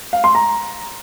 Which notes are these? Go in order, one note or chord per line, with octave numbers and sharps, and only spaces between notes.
F5
C6
A#5